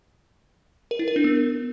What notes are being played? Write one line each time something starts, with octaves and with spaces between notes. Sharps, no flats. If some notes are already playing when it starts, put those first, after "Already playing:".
A#4
E4
A#4
D4
B3